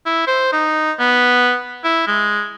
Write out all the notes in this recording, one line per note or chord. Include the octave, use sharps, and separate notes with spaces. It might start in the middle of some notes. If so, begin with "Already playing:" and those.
E4
C5
D#4
B3
E4
G#3